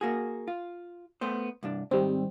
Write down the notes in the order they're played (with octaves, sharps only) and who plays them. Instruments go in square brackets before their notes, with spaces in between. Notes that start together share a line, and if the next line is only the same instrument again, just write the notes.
[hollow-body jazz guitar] A#3 F#4 G#4
F4
A3 B3 C5
C2 G2 D4
[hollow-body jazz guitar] G#2 D#3 [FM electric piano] G3 C4